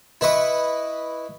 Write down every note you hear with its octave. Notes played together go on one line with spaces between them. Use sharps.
E4 B4 D#5 C#6